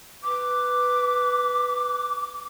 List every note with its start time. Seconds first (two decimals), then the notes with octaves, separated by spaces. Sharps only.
0.23 B4 D6